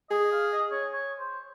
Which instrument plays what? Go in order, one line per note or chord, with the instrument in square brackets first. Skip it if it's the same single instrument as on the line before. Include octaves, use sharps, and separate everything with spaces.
[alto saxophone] G#4 [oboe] D#5
[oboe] D#5
F5
D#5
C#5
C#5
C5